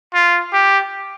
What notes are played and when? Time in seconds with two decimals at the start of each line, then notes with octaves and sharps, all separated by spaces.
0.14 F4
0.53 G4